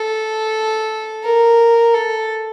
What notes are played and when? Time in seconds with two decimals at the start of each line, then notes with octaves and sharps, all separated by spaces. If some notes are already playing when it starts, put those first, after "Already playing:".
Already playing: A4
1.24 A#4
1.94 A4